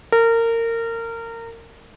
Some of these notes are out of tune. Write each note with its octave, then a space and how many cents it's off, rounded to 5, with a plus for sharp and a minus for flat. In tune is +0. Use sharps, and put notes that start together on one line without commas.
A#4 -25